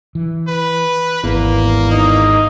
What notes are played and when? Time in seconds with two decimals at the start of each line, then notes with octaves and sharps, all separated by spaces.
0.15 E3
0.47 B4
1.23 G#1 E2 A#3
1.91 D#4